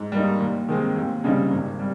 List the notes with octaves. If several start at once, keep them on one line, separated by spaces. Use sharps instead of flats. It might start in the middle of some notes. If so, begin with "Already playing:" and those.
Already playing: G#2
G3 A#3 D#4
D#2
D#3 G#3 C4
D#2
C#3 G3 C4 D#4
G#1
G3